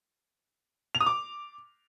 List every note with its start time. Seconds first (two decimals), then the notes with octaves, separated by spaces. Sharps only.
0.95 F7
1.01 D#6
1.06 D6